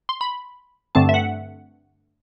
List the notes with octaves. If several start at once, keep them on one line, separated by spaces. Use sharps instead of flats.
C6
B5
G2 D3 A3 C4 A5
E5
F#5